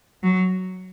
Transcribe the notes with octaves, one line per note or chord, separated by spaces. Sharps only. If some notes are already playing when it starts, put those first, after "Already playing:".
F#3